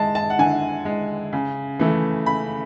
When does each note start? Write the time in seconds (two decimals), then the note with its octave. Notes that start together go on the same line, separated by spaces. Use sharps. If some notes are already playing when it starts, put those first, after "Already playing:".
Already playing: G#3 A5
0.15 A5
0.30 F#5
0.39 D3 G#5
0.85 G#3
1.33 C#3
1.80 E3 A3
2.26 C#3 B5